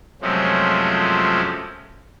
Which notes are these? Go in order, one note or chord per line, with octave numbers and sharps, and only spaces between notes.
F#2 C3 F3 G#3 A3 C#4